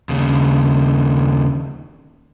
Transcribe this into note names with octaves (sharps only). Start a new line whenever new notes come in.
D#2 C#3